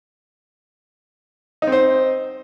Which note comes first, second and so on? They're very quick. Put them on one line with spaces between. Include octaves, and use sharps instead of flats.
D#4 C4 C5